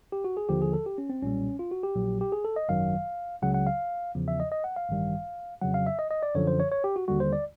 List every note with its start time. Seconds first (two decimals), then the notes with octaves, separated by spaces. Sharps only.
0.12 G4
0.24 F#4
0.37 G#4
0.49 D#2 D3 F3 G4
0.62 G#4
0.73 A4
0.86 G4
0.98 C#4
1.10 C4
1.22 B1 A#2 G3 C#4
1.59 F4
1.71 F#4
1.83 G4
1.95 A#1 A#2 F#3
2.21 G4
2.32 G#4
2.45 A4
2.56 D#5
2.69 G#1 F#2 D#3 F#3 F5
3.42 C#2 C#3 F#3 F#5
3.54 F#5
3.67 F5
4.15 E2 C#3 F3
4.28 E5
4.40 D#5
4.52 D#5
4.64 F#5
4.76 F5
4.89 A1 G2 D#3 G3
5.61 F2 C#3 F#3 F#5
5.74 F5
5.87 E5
5.99 D#5
6.11 D#5
6.23 D5
6.35 F#2 D3 F3 C#5
6.47 C5
6.60 C#5
6.72 C#5
6.84 G4
6.96 F#4
7.08 D#2 D3 G3 F#4
7.20 C5
7.33 D5